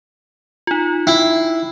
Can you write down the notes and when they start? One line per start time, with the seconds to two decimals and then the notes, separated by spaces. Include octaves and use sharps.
0.67 D#4 F4
1.07 E4 G5